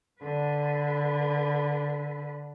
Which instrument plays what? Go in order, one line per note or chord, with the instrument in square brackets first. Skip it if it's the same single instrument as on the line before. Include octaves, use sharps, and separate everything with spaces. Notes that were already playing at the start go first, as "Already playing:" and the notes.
[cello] D3 B4